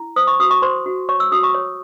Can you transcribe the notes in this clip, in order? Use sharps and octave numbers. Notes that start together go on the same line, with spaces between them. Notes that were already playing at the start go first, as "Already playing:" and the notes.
Already playing: E4
C5 D#6
C#6
F#4 D#6
C#6
C5 C6
F#4
C#5 C#6
E6
F#4 D#6
C#6
C#5